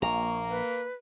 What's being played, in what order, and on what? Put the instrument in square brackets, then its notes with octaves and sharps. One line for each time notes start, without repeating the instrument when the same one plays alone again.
[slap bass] A#1 [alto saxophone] A#3 [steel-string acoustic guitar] A#5 [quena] C#6
[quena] B4